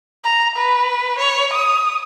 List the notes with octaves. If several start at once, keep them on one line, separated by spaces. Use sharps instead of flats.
A#5
B4
C#5
D#6